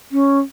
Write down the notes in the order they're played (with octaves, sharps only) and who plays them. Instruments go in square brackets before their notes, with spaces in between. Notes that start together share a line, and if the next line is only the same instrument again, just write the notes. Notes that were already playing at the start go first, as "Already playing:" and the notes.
[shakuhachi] C#4